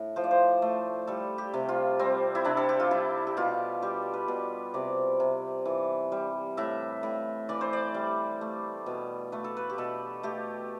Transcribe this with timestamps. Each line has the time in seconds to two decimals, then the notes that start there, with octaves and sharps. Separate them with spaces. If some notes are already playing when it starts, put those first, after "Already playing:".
Already playing: A2
0.16 F3 C5
0.24 D5
0.31 C5
0.62 A3
1.07 G3 A4
1.38 G4
1.54 C3
1.69 F4
1.99 G3 C4
2.35 E4
2.45 C3 D4
2.57 A4
2.69 G4
2.80 F4
2.91 G3 E4
3.27 G4
3.37 B2 F4
3.82 G3 G4
4.14 B4
4.28 B2
4.74 C3 D5
5.20 C3
5.66 E3
6.12 G3
6.57 A2 E5
7.03 A2
7.49 E3 D5
7.61 C5
7.73 D5
7.94 G3
8.41 A3
8.86 B2
9.32 A3 B4
9.44 A4
9.57 B4
9.70 G4
9.78 B2 A4
10.23 A3 G4